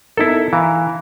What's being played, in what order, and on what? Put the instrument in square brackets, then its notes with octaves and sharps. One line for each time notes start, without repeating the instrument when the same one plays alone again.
[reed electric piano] B3 D#4 A#4 [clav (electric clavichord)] E4 A4
[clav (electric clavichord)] E3 [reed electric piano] F5 A#5